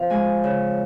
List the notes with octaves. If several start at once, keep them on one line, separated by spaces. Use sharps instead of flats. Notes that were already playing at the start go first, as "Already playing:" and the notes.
Already playing: F2 C3 F3 F5
G#3 G#5
C#3